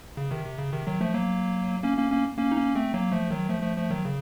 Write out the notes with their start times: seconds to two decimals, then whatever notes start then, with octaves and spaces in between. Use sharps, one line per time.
0.17 C#3
0.31 C3 D#3
0.46 C3
0.58 C#3
0.73 C3 D#3
0.87 D#3 F#3
1.01 F3 A3
1.14 F#3 A#3
1.83 A#3 C#4
1.97 A#3 C#4
2.11 A#3 C#4
2.38 A#3 C#4
2.51 D#4
2.57 A#3 C#4
2.75 A3 C4
2.94 F#3 A#3
3.12 F3 A3
3.31 D#3 F#3
3.49 F3 A3
3.63 F3 A3
3.77 F3 A3
3.91 D#3 F#3
4.05 C#3